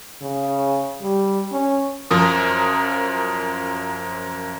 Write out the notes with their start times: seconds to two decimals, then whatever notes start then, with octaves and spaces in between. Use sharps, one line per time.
0.21 C#3
1.02 G3
1.52 C#4
2.11 F#2 F3 A#4 D#6